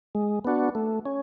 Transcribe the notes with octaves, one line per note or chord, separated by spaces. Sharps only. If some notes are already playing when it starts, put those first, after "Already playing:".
G#3
B3 D4 F#4
A3
C#4